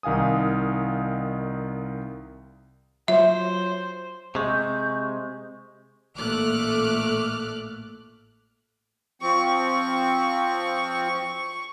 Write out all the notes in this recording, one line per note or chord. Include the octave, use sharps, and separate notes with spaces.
C2 D#3 F5 G#5 D#6
F#3 F4 C5 C#5 E5
C3 G#3 C#6 G6
A1 A#2 A3 D6 F6 F#6
F3 C4 C#6